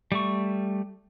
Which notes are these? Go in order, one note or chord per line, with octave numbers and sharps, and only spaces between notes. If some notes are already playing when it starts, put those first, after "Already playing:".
G3 A3 C#6